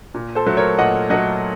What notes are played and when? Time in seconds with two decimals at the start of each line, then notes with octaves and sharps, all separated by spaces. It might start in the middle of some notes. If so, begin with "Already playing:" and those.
0.14 A#2
0.35 A4 C5
0.46 F#3 A3
0.57 A#4 C#5
0.78 A#2 D#5 F#5
1.10 F#3 A3 D#5 F#5